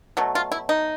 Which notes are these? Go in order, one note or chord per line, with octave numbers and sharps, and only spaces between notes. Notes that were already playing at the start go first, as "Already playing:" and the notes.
B2 F#3 A3
F4
E4
D#4